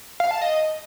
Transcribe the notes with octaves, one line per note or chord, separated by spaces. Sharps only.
F5
A5
D#5